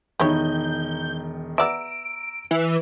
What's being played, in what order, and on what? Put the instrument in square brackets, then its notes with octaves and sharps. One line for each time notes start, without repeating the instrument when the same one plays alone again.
[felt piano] E1 D#3 D#4 [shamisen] G3 E4 C#5 [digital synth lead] G6
[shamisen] B3 D5 E5 [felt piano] A#5 E6 [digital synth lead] D7
[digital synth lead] E3